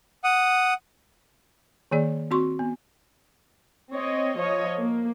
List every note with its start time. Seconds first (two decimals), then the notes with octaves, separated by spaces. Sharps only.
0.24 F#5 D#6
1.91 D#3 A#3 G#4 D5
2.31 C4 F#4 C6 C#6
2.59 B3
3.95 C4 C#5 D#5
4.38 F3 C#5 D#5
4.79 A#3